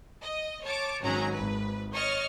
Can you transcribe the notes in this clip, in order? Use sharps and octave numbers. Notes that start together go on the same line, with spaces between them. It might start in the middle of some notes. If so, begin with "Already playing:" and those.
D#5
C#5 A5 D6
G#1 D#3 F#3 C#4 A#5
G#1 B4
C#5 D#5 C#6 F6 A6